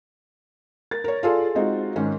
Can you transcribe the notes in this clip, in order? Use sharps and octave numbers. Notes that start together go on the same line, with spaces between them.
A#4 A6
A#4 C#5
F4 G#4 A4 D5
G#3 C4 D#4 F4 F#4
G#2 D#3 C#4